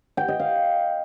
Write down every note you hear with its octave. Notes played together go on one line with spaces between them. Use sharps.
G5
D#5
F5